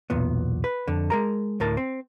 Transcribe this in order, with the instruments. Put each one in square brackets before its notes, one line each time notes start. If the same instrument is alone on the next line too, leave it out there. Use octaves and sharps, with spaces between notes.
[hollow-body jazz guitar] B1 E2 A#2 B3
B4
F2 D3
G#3 A#4 A#5
D2 A2 A#4 A5
C4